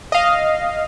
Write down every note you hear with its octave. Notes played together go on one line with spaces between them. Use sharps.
D#5 F5